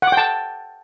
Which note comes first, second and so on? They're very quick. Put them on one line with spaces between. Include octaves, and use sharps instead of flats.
F#5 D6 G5 A5